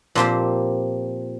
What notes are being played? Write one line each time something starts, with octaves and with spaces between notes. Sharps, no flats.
A#2 F3 C4 G4 C5